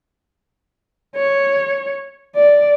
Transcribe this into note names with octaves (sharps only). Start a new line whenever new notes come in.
C#5
D5